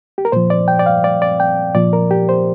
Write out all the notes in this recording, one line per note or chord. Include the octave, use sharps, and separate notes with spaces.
G4
A#4
A#2 F3 C5
D5
G5
D5
F5
D5
D5
G5
A#2 F3 D5
A#4
G4
C5